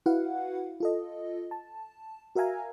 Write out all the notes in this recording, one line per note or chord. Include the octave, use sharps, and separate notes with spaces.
E4 F#4 B4 F5 F#5
F4 A4 D#5
A5
F#4 A#4 E5 F5 G#5 A#5